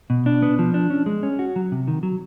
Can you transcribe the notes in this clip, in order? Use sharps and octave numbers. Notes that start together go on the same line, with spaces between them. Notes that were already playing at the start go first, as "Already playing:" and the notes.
B2
D4
B3
F3
D4
C#4
G#3
C#4
F#4
F#3
C3
D#3
F#3